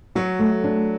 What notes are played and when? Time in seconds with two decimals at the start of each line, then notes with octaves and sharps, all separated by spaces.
0.15 F#3 F#4
0.39 A3
0.64 D4